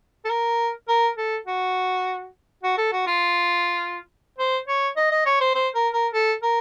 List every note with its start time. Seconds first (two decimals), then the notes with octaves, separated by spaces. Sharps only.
0.25 A4
0.29 A#4
0.88 A#4
1.17 A4
1.46 F#4
2.63 F#4
2.78 A4
2.92 F#4
3.07 F4
4.38 C5
4.68 C#5
4.97 D#5
5.11 D#5
5.26 C#5
5.41 C5
5.55 C5
5.75 A#4
5.94 A#4
6.13 A4
6.43 A#4